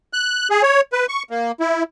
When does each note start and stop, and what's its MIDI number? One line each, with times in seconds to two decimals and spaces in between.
0.13 0.48 90
0.50 0.62 68
0.63 0.81 73
0.93 1.06 71
1.09 1.23 85
1.30 1.52 58
1.60 1.83 64